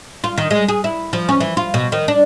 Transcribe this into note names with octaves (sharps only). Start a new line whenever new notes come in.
F4
D#3
G#3
G#4
E4
F3
C#4
E3
F4
B2
D#3
D4